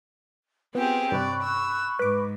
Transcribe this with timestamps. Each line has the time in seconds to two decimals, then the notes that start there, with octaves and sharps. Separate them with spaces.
0.75 B3 C4 F4 G4 G#4 B4
1.12 G2 C3 D5 B5 C#6 F#6
1.44 E6
1.99 G#2 B4 D6